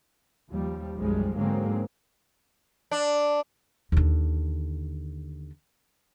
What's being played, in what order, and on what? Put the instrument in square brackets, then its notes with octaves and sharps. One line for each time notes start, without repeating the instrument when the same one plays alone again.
[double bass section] D#2 F3 G3
B1 F#2 F3 G3 G#3
G#2 D3 F#3 G#3 A#3 C4
[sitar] D4
[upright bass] D#2 D3